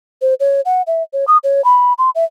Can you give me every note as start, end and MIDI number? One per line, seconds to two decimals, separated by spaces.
0.22 0.34 72
0.40 0.61 73
0.65 0.82 78
0.87 1.03 76
1.13 1.25 73
1.28 1.37 87
1.44 1.64 73
1.64 1.93 83
1.98 2.10 84
2.15 2.24 76